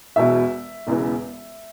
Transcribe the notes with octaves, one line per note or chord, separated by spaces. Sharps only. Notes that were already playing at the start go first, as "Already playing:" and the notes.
E1 E2 B2 E5
E1 E2 C#3 E3